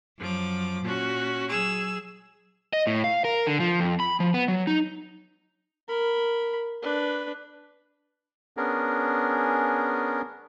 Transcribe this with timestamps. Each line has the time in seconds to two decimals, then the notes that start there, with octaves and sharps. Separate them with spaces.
0.18 F#2 F3 F#3 D6
0.83 A#2 C#4 F#4
1.49 F#3 G#4 E6
2.73 D#5
2.87 A2
3.04 F5
3.25 A#4
3.47 D3
3.60 F3
3.80 F2
4.00 B5
4.20 F3
4.34 B3
4.48 F#3
4.67 D#4
5.88 A#4 B5
6.82 D4 B4
8.57 B3 C#4 D4 G#4 A#4